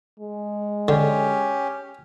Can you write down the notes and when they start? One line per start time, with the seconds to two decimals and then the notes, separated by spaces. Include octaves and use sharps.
0.20 G#3
0.88 D3 C#4 G4